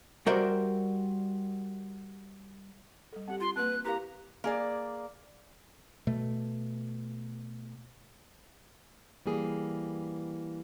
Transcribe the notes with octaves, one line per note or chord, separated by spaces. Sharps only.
G3 F#4 A#4 C5 D5 E5
G3 A4
C4 G4 F#5
F4 C6
A#3 C4 B4 F#6
E4 G4 A#4 F5 A#5
A#3 G#4 D5
B2 A3
E3 G3 A#3 G#4